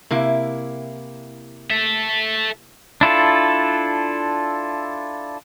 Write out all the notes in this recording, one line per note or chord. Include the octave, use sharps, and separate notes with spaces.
C3 A#3 E4
A4 E5
D4 E4 F4 A4